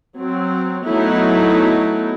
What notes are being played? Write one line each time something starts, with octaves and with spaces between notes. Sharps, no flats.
F#3 C4
F#3 A3 B3 D#4 E4